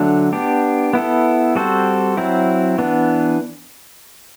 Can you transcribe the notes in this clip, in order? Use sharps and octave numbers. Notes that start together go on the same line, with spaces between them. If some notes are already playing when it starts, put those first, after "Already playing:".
Already playing: D3 F#3 A3 D4
B3 D4 G4
B3 E4 A4
G3 C4 F#4 A4 C5
F#3 C4 E4
E3 B3 D4